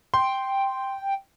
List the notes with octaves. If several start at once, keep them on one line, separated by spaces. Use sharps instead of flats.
G5 C6